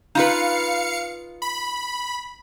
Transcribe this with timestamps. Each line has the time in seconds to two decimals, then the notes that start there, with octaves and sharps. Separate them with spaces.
0.15 D#4 F4 B4 F5 C#7
1.42 B5